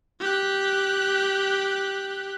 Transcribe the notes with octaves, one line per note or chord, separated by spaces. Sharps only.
G4 F#6